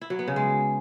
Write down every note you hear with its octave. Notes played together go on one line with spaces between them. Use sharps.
E4
F#3
B3
C#3
G#3